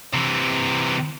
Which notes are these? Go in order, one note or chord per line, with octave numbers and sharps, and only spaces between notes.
C3 E3